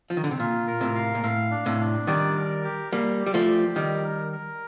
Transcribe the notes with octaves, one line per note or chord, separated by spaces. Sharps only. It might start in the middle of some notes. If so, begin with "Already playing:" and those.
F3
D#3
D3
C3
A#2 F4
A#4
A2 C3
F5
A#2
A2 F5
D4
A2 C3
D4
D#3 G3 D5
A#4
G4
G3 A#3 G4
D5
G3
F3 A3
G4
D#3 G3 A#4
A#4
A#4